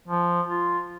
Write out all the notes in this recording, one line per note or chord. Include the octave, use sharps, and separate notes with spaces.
F3
F4